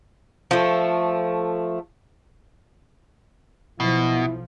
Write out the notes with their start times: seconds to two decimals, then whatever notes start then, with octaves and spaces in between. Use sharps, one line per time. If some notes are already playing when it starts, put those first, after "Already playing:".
0.51 F3 A3
3.80 B1 B2 F3 E4